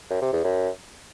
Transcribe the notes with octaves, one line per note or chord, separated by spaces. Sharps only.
F#2
C3
E2
F#2